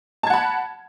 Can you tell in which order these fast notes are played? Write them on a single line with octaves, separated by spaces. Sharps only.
A5 G#6 F#5 B5